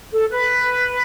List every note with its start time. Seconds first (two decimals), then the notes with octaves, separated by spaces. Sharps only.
0.12 A4
0.31 B4